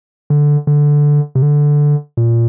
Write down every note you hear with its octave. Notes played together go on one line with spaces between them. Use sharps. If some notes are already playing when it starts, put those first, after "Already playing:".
D3
D3
C3
D3
A#2